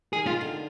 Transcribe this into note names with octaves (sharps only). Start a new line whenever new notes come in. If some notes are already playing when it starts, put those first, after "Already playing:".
D#3 G#4
D#3 F4
D3